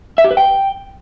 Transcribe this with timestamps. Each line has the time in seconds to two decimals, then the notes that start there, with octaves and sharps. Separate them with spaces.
0.18 E5
0.24 G4
0.31 B4
0.37 G5